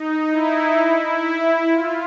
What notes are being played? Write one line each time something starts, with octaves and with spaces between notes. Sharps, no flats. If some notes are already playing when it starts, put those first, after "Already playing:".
Already playing: D#4
E4
F4